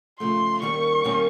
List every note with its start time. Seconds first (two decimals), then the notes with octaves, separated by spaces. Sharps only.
0.19 C#3 F3 A3 C6
0.62 D#2 D#3 G3 A#3 C#4 C#6
1.04 D#2 D#3 G3 A#3 C#4